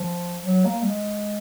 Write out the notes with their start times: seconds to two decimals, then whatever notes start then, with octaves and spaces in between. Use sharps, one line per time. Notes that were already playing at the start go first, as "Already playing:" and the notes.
Already playing: F3
0.43 F#3
0.65 A#3
0.82 G3
0.88 G#3